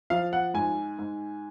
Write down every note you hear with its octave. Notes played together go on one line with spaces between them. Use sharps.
F3 F5
F#5
G#2 G#5
G#2